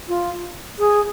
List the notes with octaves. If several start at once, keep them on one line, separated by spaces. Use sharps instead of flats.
F4
G#4